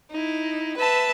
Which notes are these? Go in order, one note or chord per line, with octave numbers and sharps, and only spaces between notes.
D#4 E4
B4 E5 A5